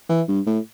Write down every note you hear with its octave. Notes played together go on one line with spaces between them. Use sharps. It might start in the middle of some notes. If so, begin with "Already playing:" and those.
E3
G2
A2